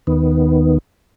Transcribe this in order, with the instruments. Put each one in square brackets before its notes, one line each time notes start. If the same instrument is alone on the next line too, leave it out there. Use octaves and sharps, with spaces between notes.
[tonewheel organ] D#2 D#3 B3